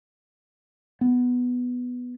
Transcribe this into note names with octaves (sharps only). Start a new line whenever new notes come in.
B3